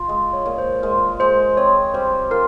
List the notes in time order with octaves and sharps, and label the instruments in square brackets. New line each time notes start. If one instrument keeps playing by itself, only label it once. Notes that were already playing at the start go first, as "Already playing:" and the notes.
Already playing: [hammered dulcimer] F4
[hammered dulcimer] G#3 [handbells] D#5
[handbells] C#5
[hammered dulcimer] A#2
[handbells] C5
[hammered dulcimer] G#3 [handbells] A#4
[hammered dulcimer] G#3 [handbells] C5
[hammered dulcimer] C4 [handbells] C#5
[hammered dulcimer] G3 [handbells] C5
[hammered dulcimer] F4 [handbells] A#4